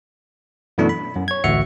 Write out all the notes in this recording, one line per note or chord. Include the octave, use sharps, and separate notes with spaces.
F#2 B2 E3 A3 D4 E4
B5
F#2
C#5 G#6
A1 D2 F#4 E5 C#7